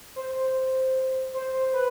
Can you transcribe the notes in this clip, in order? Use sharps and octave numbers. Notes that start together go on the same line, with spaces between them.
C5
C5
B4